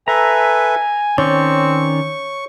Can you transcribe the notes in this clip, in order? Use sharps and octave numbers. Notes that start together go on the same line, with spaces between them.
A4 B4 E5 G#5 A#5
D#3 C4 C#4 C#5 D5 C#6